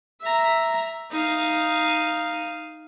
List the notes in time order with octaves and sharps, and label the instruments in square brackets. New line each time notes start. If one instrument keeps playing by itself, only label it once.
[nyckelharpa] E5 A#5
D#4 F5